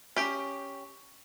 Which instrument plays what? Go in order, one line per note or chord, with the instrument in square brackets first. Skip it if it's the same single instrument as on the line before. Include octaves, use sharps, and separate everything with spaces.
[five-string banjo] C#4 G4